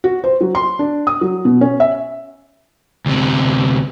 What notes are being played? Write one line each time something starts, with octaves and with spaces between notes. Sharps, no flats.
F#4
C5
F#3
C6
D4
D#6
F#3
B2
C#4
E5
D2 C3